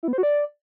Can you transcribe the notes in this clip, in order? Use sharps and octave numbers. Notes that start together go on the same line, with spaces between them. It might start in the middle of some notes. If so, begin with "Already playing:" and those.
E4
B3
C5
F#4
D5